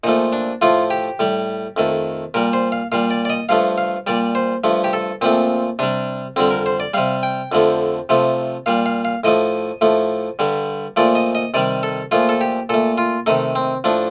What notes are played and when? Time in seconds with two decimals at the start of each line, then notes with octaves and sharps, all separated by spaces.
0.04 A#2 F3 A3 D#4
0.33 D4
0.61 A2 F3 A3 F4
0.90 G4
1.19 A2 G3
1.76 F2 D#3 A3
2.34 A#2 G3 A#4
2.53 C5
2.72 F5
2.92 A#2 G3 F5
3.10 D5
3.25 D5
3.30 D#5
3.49 G2 F3 A3 F5
3.78 F5
4.07 A#2 G3 D5
4.35 C5
4.64 G2 F3 A3
4.84 G4
4.93 A4
5.21 A#2 F3 A3 C4
5.79 C3 G3 D4
6.36 F2 D3 G3 C4
6.51 A#4
6.66 C5
6.80 D5
6.94 C3 G3 F5
7.23 G5
7.52 F2 D3 F3 A3
8.09 C3 F3 A3
8.66 A#2 G3 F5
8.86 F5
9.05 F5
9.24 A2 F3 A3 D#5
9.81 A2 F3 A3
10.39 G2 D3 G3
10.96 A#2 F3 A3 D5
11.15 D#5
11.35 D#5
11.54 C3 D#3 G3 D5
11.83 A4
12.11 A#2 F3 A3 F4
12.29 A4
12.41 G4
12.69 A#2 A3 A4
12.98 F4
13.26 C3 D#3 A3 D#4
13.55 C4
13.84 A2 F3 A3 D4